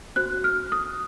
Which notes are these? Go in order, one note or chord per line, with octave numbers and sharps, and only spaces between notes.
F#4 C5 F#6
F6
D#6